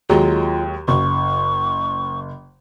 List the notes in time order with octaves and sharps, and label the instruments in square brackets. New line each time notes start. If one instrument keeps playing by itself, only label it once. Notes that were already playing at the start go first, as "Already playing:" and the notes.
[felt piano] D#2 F#3 G#3 [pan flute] F4
[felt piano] F#1 [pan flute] C#6